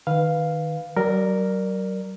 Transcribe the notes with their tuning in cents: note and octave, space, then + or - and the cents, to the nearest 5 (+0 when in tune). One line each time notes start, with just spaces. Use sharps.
D#3 -10 B4 +0 F5 +0
F#3 +40 A#4 +0 D5 +15